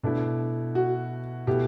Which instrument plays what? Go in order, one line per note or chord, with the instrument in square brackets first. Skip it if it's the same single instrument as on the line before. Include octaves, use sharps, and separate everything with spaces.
[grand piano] B2 A3 E4 [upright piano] D4
[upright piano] F#4
[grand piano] B2 A3 E4 [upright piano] G4